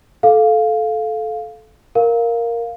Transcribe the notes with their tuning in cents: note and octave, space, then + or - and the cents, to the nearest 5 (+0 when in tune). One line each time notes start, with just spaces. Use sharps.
A4 -15 F5 +0
A#4 +0 F5 +0